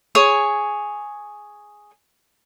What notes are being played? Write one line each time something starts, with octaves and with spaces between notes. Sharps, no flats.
G#4 C#5 G#5